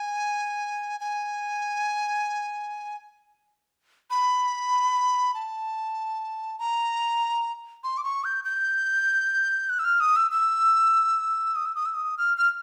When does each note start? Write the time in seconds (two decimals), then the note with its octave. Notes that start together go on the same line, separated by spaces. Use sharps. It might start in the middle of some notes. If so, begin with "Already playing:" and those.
Already playing: G#5
1.00 G#5
4.10 B5
5.34 A5
6.59 A#5
7.84 C6
7.97 D6
8.04 C#6
8.24 G6
8.45 G6
9.70 F#6
9.79 E6
9.84 F6
10.00 D#6
10.16 E6
10.31 E6
11.56 D#6
11.65 E6
11.75 D#6
11.86 E6
11.95 D#6
12.18 F6
12.37 F6